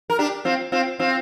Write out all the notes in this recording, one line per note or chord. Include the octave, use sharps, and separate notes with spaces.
A#4
D4 G4
C4 F4
C4 F4
C4 F4